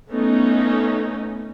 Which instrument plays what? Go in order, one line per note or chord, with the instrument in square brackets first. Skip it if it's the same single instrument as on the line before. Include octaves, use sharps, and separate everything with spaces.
[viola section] A3 B3 C#4 D#4